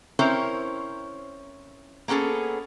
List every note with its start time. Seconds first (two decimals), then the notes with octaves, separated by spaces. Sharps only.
0.19 C4 C#4 E4 A#4 C5 C#5
2.08 A#3 B3 C#4 G#4 A4